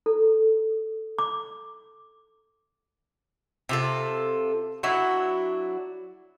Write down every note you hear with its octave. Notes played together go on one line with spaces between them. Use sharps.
A4
D6
C3 F4 A4
F#3 D4 E4 F#4